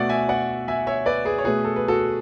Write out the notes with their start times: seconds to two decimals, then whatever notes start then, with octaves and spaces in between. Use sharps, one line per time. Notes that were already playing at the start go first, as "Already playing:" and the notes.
Already playing: B2 A3 D5 F#5
0.09 E5 G#5
0.29 D5 F#5
0.68 E5 G#5
0.87 C#5 E5
1.06 B4 D5
1.25 G#4 B4
1.38 C#5
1.45 B2 A3 G#4 B4
1.64 A4
1.76 B4
1.88 F#4 A4